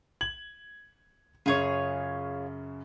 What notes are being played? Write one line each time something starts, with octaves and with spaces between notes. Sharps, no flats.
G#6 F#7
F#2 C#3 F4 G#4 C#5